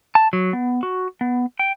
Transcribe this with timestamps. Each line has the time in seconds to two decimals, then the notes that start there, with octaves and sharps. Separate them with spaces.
0.15 A5
0.33 F#3
0.53 B3
0.83 F#4
1.21 B3
1.59 G5